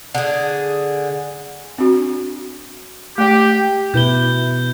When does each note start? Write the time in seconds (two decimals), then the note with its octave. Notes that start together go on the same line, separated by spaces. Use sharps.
0.15 D3 G#4
1.78 C4 D4 F#4
3.18 A3 G4
3.94 B2 E4 B4 G6 G7